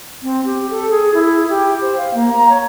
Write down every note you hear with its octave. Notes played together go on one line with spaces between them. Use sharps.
C4
G4
A4
G#4
E4
G4
C5
F5
A#3
A#5
C#5